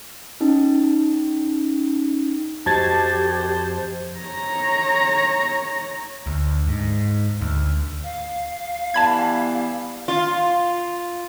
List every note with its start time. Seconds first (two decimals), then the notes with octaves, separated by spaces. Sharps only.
0.41 C#4 D#4
2.66 F2 F#4 G4 C5 D#5 A5 G#6 A6
4.19 C#5 A#5
6.27 D2
6.67 G#2
7.41 D2
8.03 F5
8.94 E3 G3 B3 A5 B5 G#6
10.08 F4